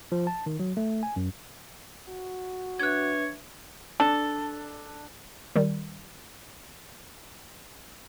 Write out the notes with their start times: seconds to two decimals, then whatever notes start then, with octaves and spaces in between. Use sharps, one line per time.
0.12 F3
0.27 A5
0.46 D#3
0.59 F#3
0.77 A3
1.03 G#5
1.16 F#2
2.09 F#4
2.80 D4 B4 C#5 E5 F#6 G#6
4.00 D4 A4
5.56 D#3 G3